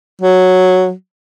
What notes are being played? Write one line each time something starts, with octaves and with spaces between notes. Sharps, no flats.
F#3